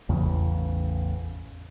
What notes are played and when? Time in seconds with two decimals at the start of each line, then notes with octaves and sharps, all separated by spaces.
0.09 A1 E2 C#3 C#4